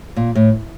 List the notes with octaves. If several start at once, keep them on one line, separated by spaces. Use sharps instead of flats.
A#2
A2